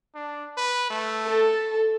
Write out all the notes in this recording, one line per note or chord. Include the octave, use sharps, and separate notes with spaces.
D4
B4
A3
A4